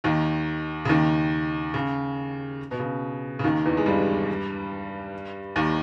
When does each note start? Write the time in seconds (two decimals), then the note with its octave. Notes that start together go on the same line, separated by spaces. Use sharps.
0.04 D#2 D#3
0.85 C#3
0.89 D#2 D#3
1.74 C#3
2.71 B2
2.80 C#3
3.39 C#3
3.44 D#2 D#3
3.65 E2 E3
3.77 G#3
3.86 G2 G3
5.56 D#2 D#3